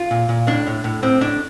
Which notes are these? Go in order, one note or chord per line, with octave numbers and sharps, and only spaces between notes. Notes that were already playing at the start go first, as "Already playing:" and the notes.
Already playing: F4
A#2
A#2
A2 D4
A2
A2
A2 C4
A2 D4